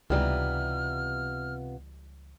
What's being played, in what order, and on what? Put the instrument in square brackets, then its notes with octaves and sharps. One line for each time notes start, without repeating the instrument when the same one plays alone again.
[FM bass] C#2 [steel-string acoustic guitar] C3 B3 F4 [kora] E3 G3 D#4 [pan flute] F6